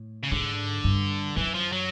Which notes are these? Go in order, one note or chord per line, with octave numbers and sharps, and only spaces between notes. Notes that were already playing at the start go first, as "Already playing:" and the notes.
Already playing: A2
C#3
G#2 D3
G2
F#2 E3
F3
F#3